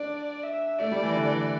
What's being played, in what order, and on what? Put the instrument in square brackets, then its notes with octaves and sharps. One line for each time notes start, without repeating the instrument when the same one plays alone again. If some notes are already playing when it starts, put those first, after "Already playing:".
Already playing: [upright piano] D4 [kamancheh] D5
[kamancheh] E5
[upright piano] A3 [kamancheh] D5
[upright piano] G3
E3
D3
E3